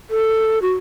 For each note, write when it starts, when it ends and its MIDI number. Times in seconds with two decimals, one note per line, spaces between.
0.10 0.59 69
0.62 0.73 66